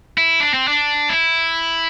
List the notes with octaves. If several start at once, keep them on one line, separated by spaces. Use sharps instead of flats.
E4
D4
C4
D4
E4